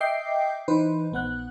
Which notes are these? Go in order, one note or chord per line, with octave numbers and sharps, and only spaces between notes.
D#5 E5 G5 D6 G6 C7
E3 D#4 B4 C5
A#1 B3 F#5 F#6